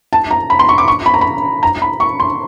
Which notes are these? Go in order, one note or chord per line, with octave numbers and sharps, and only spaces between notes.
A5
A#5
B5
C6
C#6
D6
C#6
B5
A#5
B5
A#5
B5
C#6
C6